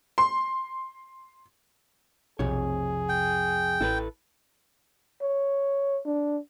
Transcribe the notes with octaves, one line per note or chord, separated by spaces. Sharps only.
C6
B1 F2 C3 G#4 C#5
G5
A1 E4 A4 B4
C#5
D4